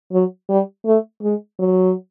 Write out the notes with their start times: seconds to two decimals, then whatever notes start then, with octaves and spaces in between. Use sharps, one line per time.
0.12 F#3
0.49 G3
0.85 A3
1.22 G#3
1.59 F#3